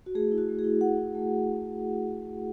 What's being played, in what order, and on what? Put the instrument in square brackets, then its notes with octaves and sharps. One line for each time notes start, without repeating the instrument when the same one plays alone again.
[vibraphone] F#4
A3 G#4
E4
F#4
A3
G#4
E4
A3 F#5
E4
A3
E4